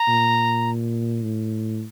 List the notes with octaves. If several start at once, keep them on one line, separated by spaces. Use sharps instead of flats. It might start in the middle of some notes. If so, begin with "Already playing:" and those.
Already playing: A#5
A#2
A2